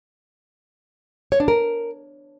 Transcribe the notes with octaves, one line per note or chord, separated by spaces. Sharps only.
C#5
D4
A#4